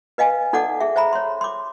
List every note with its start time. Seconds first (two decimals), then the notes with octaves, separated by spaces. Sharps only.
0.18 B4 D#5 F5 G#5
0.53 D#4 A4 D5 F#5 D6
0.80 G#4 E5
0.96 C5 E5 A#5 B5
1.13 C#5 C6
1.41 C6 D6